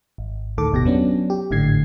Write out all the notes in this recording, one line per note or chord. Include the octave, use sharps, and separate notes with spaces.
G#1
D2 A2 D#3 A4 D6
G1 E2 B2 G4 A#6
F#3 B3 C#4 D4
G4
G#1 A2 D3 G#6 C7